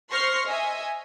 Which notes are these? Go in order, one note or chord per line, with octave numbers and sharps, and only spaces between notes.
C5 C6 C#6 F6 A#6 C7
D#5 E5 G#5